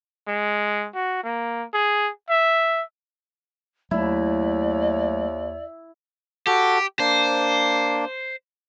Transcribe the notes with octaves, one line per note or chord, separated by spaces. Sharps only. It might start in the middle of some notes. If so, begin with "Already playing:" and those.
G#3
F#4
A#3
G#4
E5
D#2 F#3 A3 E4 D5
F#4 G4 A4
A#3 D4 C5